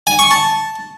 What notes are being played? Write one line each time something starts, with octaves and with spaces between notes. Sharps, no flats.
G#5
C#6
A5